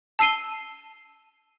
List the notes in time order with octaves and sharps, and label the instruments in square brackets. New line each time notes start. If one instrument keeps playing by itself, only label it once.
[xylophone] A5 E6 C7 D#7 G7